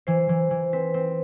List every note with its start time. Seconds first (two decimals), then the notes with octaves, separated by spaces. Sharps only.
0.07 E3 C5
0.29 E3
0.51 E3
0.73 C4 B4
0.94 C4